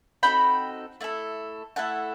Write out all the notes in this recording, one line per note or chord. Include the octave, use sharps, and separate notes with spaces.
C4 D#4 F#4 A4 G5 B5
A3 E4 A4
A3 E4 A4 F#5 A5